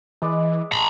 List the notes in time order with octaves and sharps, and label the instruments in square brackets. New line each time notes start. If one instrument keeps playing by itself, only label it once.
[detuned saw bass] E3 [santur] G#3 B4 D5
[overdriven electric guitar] A#5 B5